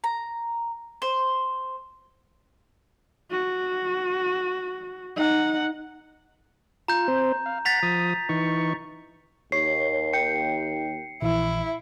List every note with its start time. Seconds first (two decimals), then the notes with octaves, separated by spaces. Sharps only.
0.04 A#5
1.02 C5
3.31 F#4
5.16 D#4 F#5
6.88 F4 A#5 G6
7.08 C4 C5
7.46 F5
7.65 F#5 A#5 A6 B6 F7
7.83 F3 D#6
8.29 E3 D#4 C#6
9.52 D#2 C#5 C7
10.13 G5 C#7
11.22 A#1 E3 E4